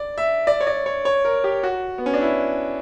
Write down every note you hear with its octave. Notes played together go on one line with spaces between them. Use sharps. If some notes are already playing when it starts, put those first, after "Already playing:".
Already playing: D5
E5
D5
C#5
D5
C#5
C#5
A#4
G4
F#4
B3
C#4
D4
E4